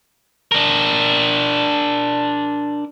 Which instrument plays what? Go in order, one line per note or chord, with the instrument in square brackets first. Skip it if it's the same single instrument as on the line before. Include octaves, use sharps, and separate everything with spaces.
[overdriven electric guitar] D4 A#4